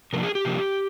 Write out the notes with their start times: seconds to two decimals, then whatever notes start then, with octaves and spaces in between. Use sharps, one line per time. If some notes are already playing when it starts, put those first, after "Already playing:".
0.13 C3 F3 A#3 D4 A#4
0.23 G#4
0.35 G4
0.45 C3 F3 A#3 D4